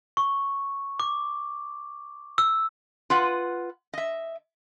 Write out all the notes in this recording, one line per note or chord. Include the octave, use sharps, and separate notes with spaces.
C#6
D6
E6
F4 B4 F#5
D#5 E5